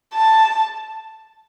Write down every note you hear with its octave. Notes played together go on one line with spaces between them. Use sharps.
A5